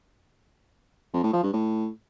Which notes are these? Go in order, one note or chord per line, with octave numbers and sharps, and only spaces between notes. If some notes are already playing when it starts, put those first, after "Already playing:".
F2
A2
F3
G2
A2